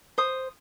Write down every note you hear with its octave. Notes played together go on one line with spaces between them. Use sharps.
C5 D#6